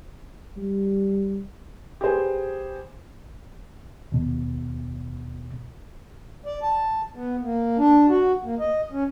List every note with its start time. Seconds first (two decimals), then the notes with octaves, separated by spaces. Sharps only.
0.57 G3
2.01 G4 G#4 B4 C5 G#5
4.12 D#2 B2
6.46 D5
6.62 A5
7.16 B3
7.43 A#3
7.78 D4
8.09 F#4
8.45 A#3
8.59 D#5
8.92 C#4